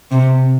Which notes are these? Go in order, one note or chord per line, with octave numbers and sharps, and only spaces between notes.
C3